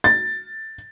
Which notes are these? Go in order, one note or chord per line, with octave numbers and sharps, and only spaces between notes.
A6